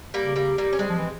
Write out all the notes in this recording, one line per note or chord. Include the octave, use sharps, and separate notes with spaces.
G3 A#3
C#3
G3 A#3
G3 A#3
C#4
G3 G#3 C4
F3
E3